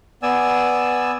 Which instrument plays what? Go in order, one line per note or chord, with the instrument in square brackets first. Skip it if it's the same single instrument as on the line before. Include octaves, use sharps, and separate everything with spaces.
[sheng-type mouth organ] B3 D5 G#5 E6